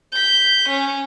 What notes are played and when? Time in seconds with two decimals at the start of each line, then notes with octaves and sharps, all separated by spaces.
0.12 G6 B6
0.69 C#4